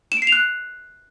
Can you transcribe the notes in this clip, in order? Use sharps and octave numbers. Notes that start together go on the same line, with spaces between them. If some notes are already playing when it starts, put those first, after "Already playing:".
E7
D7
C7
F7
F#6